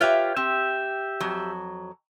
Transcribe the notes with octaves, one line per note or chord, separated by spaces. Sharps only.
F4 G4 B4 C#5 E5
C4 G4 E5
F2 F#3